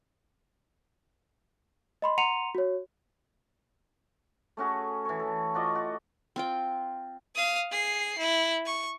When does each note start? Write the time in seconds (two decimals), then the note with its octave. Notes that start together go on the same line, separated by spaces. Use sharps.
2.02 D#5 B5 C6
2.18 F#5 A#5 C6 C#7 D#7 F7
2.55 F#4 C#5
4.57 A3 C#4 F#4 G#4
5.05 E3 C#5
5.19 A4
5.54 F4 F#4 D5 D#5
5.75 F#4
6.36 C4 F4 G5
7.36 F5 D#6
7.71 G#4 C7
8.18 E4
8.66 C#6